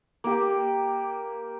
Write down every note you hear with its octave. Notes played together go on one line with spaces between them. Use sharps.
A#3 G4